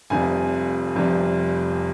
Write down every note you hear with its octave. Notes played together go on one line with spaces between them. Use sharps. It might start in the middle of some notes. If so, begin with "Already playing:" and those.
F1 F2 C3 G3 G#5
F1 F2 C3 G3